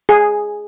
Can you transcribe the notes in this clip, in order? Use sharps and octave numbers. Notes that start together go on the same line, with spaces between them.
G#4